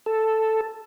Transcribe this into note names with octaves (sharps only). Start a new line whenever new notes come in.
A4